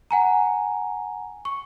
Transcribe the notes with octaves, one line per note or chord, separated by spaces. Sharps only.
F#5 G#5 A#5
C#6